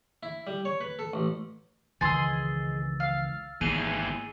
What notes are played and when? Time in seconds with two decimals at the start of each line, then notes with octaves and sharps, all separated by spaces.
0.23 E4
0.47 G3
0.65 C#5
0.81 B4
0.99 A4
1.13 A1
2.01 C#2 D#3 E3 G#4 D#5 C6 E6 A6
3.00 F5
3.61 G#1 D#2 E3 G#4 D#7